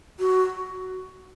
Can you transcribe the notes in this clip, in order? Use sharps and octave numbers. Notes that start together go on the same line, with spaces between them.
F#4